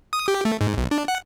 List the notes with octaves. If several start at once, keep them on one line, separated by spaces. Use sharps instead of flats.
D#6
G4
A3
G#2
B1
D4
F#5